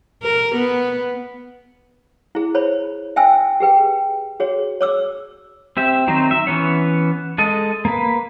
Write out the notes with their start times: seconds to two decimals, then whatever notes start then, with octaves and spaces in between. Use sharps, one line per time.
0.23 A#4
0.55 B3
2.35 E4 G#4
2.55 C5 C#5 B5
3.16 E5 G5 G#5 E6
3.60 G4 G#4 B4 G5
4.40 F#4 G#4 C#5
4.81 C#5 D6 E6
5.77 C4 G4 E5
6.07 D#3 F#3 C4 D#4 C5
6.31 E5
6.47 E3 B3 C#4 C#5
7.38 G#3 A4 D#5
7.85 A#3 B4